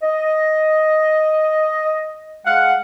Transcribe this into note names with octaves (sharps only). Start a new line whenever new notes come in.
D#5
G#3 F5 F#5